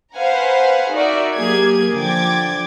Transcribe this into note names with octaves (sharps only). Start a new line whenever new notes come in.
B4 C5 F5 F#5 G#5 A#5
D#4 F#4 A#4 D5 E5
F#3 A#3 G4 G#4 G#6
D3 F3 G5 D6 G#6 A6